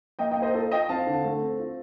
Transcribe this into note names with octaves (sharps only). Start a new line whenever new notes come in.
A#3 D#5 G5
D#5 G5
A#3
C5 D#5
F4 A4 C5
F4 D#5 G5
C4 F5 A5
D3
A3
C4
F4